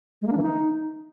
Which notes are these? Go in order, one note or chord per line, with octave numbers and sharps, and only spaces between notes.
G#3
A#3
D4
E3
D#4